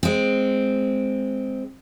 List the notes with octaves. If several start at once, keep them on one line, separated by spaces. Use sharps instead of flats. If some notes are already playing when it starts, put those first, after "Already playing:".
G#3 C4